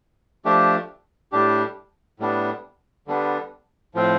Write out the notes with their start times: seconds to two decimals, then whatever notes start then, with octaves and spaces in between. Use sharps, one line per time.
0.45 F3 A3 D4 G4
1.32 A2 G3 D4 G4
2.20 A2 G3 B3 D4
3.07 D3 G3 B3 D4
3.95 A2 F3 C4 F4